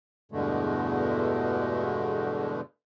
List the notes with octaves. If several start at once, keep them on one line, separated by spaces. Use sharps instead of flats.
E2 G2 B2 D3 G#3 A3